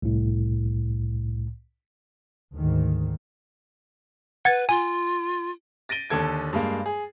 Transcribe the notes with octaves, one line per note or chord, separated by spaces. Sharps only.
C2 A2
D2 G#2 D#3
B4 F#5 G#6 A6
F4 G#5
A6 A#6 D7 D#7 G7
D#2 D3 A4 G#6 D7
G2 G#3 A#3
G#4